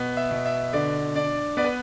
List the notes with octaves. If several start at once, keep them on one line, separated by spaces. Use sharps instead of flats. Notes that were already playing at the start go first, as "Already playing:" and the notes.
Already playing: B2 B3
E5
B2
E5
D3 D5
D4 D5
B3 D5
B4